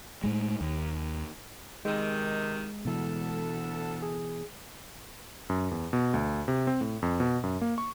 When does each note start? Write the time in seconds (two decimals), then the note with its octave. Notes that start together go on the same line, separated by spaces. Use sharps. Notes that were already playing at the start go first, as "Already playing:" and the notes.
0.24 A2 G#3
0.61 D#2
1.85 C3 D#3 G#3
2.85 D2 B2 E3 A4
4.02 G#4
5.50 F#2
5.71 E2
5.93 B2
6.14 D2
6.48 C3
6.67 C4
6.81 A2
7.02 F2
7.20 B2
7.43 F#2
7.61 A#3
7.78 C#6